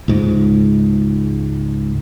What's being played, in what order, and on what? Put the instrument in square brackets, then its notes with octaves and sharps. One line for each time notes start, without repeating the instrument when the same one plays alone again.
[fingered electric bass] C#2 G#2